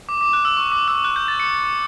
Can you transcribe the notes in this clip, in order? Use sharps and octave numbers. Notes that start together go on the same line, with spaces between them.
D6
D6
F#6
E6
C#6
D6
E6
F#6
G6
A6
C#7